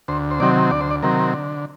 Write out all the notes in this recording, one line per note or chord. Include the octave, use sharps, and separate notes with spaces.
D2 C5
C5
C3 D#3 F#3 C4 D5
D2 D5
C5
D5
C3 D#3 F#3 C4 A#4
D3